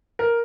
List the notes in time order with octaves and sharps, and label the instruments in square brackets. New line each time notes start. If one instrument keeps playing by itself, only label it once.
[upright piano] A#4